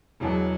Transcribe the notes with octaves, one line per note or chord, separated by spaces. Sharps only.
E1 E2 B2 F#3